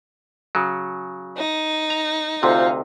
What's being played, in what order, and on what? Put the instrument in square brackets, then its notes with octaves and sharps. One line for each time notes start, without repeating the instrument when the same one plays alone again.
[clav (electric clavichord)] C#3 F#3
[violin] D#4
[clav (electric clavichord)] A#5
[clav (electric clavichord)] D2 C3 [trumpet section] F4 C5 F5